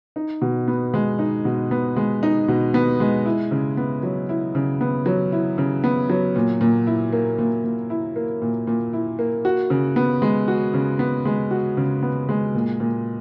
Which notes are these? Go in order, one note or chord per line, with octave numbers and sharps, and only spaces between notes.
D#4
B2
B3
G#3
D#4
B2
B3
G#3
D#4
B2
B3
G#3
E4
C#3
B3
F#3
E4
C#3
B3
F#3
E4
C#3
B3
F#3
A#2
A#2
E4
A#3
A#2
A#2
E4
A#3
A#2
A#2
E4
A#3
F#4
C#3
B3
G#3
F#4
C#3
B3
G#3
F#4
C#3
B3
G#3
A#2
A#2